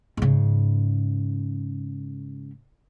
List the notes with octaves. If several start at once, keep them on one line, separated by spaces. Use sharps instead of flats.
G#2 C#3